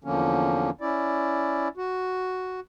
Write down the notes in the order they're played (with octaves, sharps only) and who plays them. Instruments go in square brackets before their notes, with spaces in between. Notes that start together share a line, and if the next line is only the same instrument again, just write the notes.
[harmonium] E2 D3 F3 A#3 C#4
C#4 E4 D5
F#4